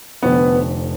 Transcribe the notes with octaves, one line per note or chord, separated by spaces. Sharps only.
F1 F2 D3 B3 B4